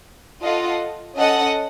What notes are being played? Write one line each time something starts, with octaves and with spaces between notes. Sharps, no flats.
F4 A4 D#5 F#5
C#4 A4 D#5 F#5